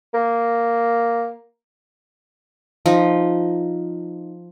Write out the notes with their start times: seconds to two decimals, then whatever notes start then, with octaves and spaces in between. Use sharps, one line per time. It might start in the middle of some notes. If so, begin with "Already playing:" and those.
0.14 A#3
2.86 F3 D#4